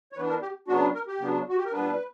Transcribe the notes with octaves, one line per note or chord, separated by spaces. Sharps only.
C#5
E3 B3 D4 B4
A#4
G4
C#3 F#3 B3 D4 F#4
A#4
G4
C#3 F#3 B3 D4
F#4
G4
A#4
A#2 G3 B3 D4 B4